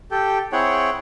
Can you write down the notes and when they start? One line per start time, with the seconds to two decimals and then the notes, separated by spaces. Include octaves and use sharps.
0.11 G4 A4 G5
0.52 C4 E4 G#4 C#5 F#5 G5